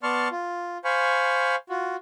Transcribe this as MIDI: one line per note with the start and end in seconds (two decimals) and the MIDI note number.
0.03 0.28 59
0.03 0.28 74
0.03 0.28 81
0.03 0.28 84
0.03 0.28 85
0.03 0.28 89
0.32 0.78 65
0.85 1.56 72
0.85 1.56 77
0.85 1.56 80
0.85 1.56 83
0.85 1.56 85
1.70 1.96 65
1.70 1.96 66